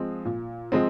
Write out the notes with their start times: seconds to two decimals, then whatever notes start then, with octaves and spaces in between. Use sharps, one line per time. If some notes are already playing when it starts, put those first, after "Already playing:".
Already playing: F3 G#3 C4
0.25 A#2
0.72 F3 G#3 C4